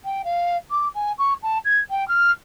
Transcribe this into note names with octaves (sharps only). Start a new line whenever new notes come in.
G5
F5
D6
G#5
C#6
A5
G#6
G5
F6